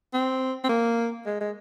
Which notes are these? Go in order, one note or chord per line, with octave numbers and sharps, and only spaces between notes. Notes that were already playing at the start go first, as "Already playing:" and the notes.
C4
C4
A#3
G#3
G#3